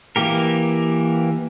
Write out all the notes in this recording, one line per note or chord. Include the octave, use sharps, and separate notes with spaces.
E3 A#3 G4 A#4